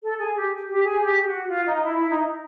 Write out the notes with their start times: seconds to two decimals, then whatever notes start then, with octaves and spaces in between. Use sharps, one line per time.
0.03 A4
0.19 G#4
0.36 G4
0.68 G4
0.84 G#4
1.01 G4
1.21 G4
1.25 F#4
1.50 F4
1.66 D#4
1.82 E4
1.98 E4
2.10 D#4